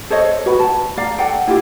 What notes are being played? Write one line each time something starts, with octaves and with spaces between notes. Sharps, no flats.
A4 C5 C#5 D#5
F#4 B4 B5
A5
D5 F5 A#5
A4 D5 F#5 G5
E4 F4 G4 F5